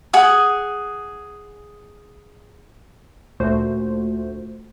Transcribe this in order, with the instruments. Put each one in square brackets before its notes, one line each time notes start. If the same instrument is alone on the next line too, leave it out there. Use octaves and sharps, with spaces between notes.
[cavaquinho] G#4 F#5 D#6
[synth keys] D2 A#2 A3 F#4 C5